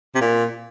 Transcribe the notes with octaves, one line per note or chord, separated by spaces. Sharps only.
C3
A#2